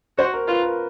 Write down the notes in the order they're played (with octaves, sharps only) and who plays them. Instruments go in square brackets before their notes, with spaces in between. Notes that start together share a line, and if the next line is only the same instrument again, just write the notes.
[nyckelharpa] F#4 [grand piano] C5
[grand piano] A#4
[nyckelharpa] F4 [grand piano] B4
[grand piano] A#4